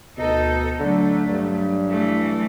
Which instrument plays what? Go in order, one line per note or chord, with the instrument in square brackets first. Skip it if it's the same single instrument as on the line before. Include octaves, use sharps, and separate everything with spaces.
[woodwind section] D2 D#5 [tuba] B2 [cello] D#4 A4
[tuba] D3 [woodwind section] F#3 [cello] A3
[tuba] G2
[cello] E3 A3